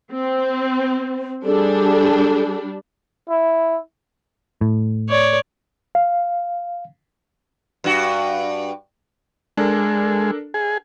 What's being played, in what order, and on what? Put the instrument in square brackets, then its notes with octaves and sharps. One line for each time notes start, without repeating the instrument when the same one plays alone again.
[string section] C4
[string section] G3 D4 [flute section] G#4 A4
[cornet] E4
[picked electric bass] A2
[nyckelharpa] C#5 D5
[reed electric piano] F5
[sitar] G2 F#4
[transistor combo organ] G#3 [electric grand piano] D4 A4 A#4
[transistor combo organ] G#4